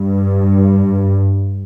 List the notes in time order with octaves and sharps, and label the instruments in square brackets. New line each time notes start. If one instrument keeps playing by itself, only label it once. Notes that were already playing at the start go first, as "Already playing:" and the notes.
Already playing: [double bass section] G2